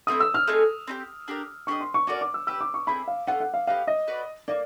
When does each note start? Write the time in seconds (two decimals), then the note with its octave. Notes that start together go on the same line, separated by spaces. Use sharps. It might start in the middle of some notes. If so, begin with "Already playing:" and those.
0.07 A3 C4 E4 D#6
0.20 E6
0.34 F6
0.48 A3 C4 D#4 G#4
0.88 C4 D#4 G4
1.28 D4 G4 A#4
1.67 D4 G4 A#4 D#5 C#6
1.81 C6
1.94 C#6
2.07 C#4 F#4 A#4 D5 D6
2.21 D6
2.34 E6
2.47 G4 B4 E5 E6
2.61 D6
2.74 C#6
2.87 C4 E4 G#4 B5
3.08 F5
3.27 A3 C#4 F4 F#5
3.40 F#5
3.54 F5
3.67 B3 D#4 G4 F5
3.87 D#5
4.07 F#4 B4 D5
4.48 A#3 D#4 D5